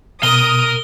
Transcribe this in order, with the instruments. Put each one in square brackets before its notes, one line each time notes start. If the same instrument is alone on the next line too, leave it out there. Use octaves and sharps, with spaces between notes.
[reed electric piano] B2 [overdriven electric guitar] A#4 A#5 [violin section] D#6 [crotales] G7